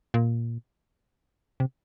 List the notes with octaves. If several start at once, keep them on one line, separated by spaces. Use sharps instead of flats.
A#2
C3